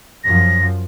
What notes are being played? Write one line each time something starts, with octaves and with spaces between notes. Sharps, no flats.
F#2 F3 A#6